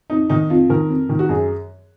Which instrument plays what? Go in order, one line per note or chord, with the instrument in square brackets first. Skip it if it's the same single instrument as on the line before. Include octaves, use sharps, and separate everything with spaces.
[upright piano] F2 D#4
D#3 D#4
F2 F4
D#3 A#4
F2
D#3
F#4
F#2 G#4